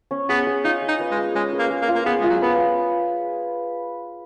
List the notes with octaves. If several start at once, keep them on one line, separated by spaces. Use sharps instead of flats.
C#4
B3 G#4
G#4
D#4 F4
G#4
D#4
B4
G#3
G#4
G#3 C#4
B4
A#3
G#4
A#3
F4
A#3
B3 G#4
G#3 F4
F#3
B3 B4